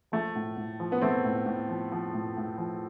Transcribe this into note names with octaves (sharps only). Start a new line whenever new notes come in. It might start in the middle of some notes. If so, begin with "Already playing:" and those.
F3 A3
A2
A2
F3
B3
F3 A3 C4
A2
A2
F3
F3
A2
A2
F3